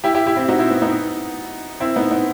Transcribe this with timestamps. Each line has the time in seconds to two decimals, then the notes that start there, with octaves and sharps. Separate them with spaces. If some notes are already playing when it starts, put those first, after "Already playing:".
0.04 E4 G4
0.14 E4 G4
0.26 E4 G4
0.37 C4 E4
0.48 D#4 F#4
0.59 C4 E4
0.71 B3
0.82 B3 D#4
1.80 C4 E4
1.96 B3 D#4
2.11 B3 D#4